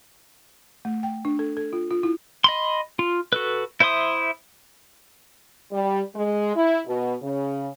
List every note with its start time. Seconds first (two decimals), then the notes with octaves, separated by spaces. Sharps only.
0.85 A3
1.03 G5
1.25 D4
1.39 A4
1.57 A4
1.73 F4
1.91 F4
2.03 E4
2.44 D#5 B5 C6
2.99 F4
3.33 F#4 A4 B4
3.80 E4 C5 E5 C6 D#6
5.71 G3
6.15 G#3
6.55 E4
6.86 B2
7.22 C#3